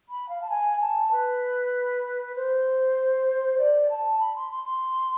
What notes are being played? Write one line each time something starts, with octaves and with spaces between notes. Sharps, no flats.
B5
F5
A5
G#5
A5
B4
C5
D5
A5
B5
C6
C6
C6